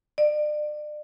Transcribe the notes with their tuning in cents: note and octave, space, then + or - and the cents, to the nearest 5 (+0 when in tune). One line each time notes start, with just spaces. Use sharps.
D5 +35